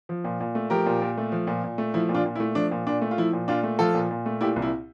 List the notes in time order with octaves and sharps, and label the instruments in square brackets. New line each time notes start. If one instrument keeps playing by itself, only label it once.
[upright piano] F3
A#2
A#2
A3
F3 G4 A#4
A#2
A#2
A3
F3
A#2
A#2
A3
F3 E4
A#2
D4 F4
A#2
E4
A3
F3 D4
A#2
A#2 D4
A3
F4
F3 E4
A#2
A#2 D4 F4
A3
F3 F4 A4
A#2
A#2
A3
A#2 E4 G4
C2
E4